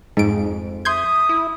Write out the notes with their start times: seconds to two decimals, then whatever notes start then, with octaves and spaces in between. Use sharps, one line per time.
0.17 F2 G#2 D7
0.85 E5 C6 D#6 G6 G#6
1.29 E4